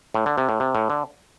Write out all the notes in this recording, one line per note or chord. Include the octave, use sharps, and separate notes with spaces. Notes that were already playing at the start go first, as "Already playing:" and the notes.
A2
D3
C3
A2
C3
A2
D3